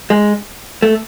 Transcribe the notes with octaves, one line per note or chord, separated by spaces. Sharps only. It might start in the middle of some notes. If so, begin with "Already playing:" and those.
G#3
A3